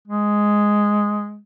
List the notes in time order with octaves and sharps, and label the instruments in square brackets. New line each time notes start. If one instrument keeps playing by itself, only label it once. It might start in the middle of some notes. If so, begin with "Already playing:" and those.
[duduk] G#3